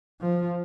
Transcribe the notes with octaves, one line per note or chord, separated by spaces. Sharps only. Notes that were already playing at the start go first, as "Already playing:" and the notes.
F3